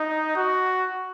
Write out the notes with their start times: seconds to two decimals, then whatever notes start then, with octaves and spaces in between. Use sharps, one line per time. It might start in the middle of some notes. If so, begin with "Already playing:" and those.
Already playing: D#4
0.36 F#4